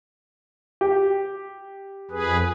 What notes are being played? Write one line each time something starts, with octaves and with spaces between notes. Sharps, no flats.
G4
F2 G#4 B4